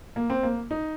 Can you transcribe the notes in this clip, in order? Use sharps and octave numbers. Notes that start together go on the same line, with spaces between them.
A#3
C4
A#3
D#4